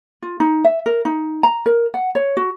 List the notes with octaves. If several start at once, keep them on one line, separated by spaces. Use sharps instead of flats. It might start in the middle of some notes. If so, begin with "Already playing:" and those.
F4
D#4
E5
A#4
D#4
A#5
A#4
F#5
C#5
F#4